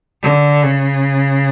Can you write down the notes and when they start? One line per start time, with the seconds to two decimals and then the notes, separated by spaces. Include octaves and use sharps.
0.23 D3
0.62 C#3